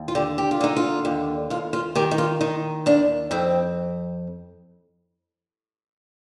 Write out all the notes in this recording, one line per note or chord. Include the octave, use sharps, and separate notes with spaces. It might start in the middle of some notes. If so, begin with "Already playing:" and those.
Already playing: D#2
F4
D3 G4
G4
F4
D3 D#4
F4
D#2
D#2 F4
F4
D#3 G4
D#4
F4
D#3 D#4
D#2 D4
F2 C4